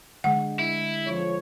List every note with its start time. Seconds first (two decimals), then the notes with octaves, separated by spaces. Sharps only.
0.24 D3 G#3 F#5
0.59 E4
1.06 F2 C#5